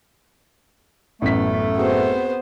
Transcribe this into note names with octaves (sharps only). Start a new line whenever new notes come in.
A1 F#2 A3 B3 B6
B3 C4 F#4 G#4 C5